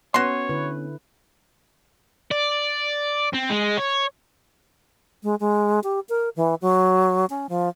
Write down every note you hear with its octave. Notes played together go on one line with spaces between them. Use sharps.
B3 C#4 F#4 C#5 C6
D3 E4 B4
D5
C4
G#3
C#5
G#3
G#3
G4
A#4
E3
F#3
C#4
F3